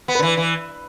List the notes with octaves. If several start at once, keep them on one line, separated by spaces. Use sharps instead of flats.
B3
D3 B4
E3
E3